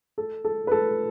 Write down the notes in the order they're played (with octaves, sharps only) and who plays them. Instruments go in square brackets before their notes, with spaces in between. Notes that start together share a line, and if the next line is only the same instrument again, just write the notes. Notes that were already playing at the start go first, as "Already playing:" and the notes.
[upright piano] A4
A4
B4
A4